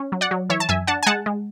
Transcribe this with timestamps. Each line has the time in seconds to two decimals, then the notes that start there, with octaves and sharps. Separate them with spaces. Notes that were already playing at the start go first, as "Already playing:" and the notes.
Already playing: C#4
0.12 F#3
0.21 D5 F#5
0.31 F#3
0.49 E3 C#5 E5
0.60 A5
0.69 F#2 E5 G#5
0.87 D4 F#5 A5
1.03 G#5
1.06 G#3 F#5 A5
1.26 G#3